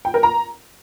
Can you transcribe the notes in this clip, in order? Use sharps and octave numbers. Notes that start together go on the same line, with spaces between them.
G5
A#4
A#5